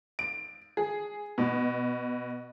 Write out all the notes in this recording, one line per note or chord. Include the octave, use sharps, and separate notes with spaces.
D7
G#4
B2